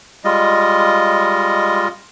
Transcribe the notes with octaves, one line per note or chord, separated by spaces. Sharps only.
G3 G#3 F4 D#5